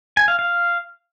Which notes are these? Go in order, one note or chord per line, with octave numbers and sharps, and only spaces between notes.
G#5
F5
F5